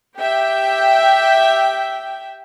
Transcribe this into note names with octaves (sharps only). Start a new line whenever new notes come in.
G4 E5 G5